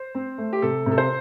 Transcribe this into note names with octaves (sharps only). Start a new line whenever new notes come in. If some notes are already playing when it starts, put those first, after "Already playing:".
Already playing: C5
C4
A3
G4
C3 A4
C3
A4
C5